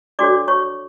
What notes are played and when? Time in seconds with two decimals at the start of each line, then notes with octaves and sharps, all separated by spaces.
0.19 D4 F#4 A4 C#5 D5 D6
0.48 C#5 C#6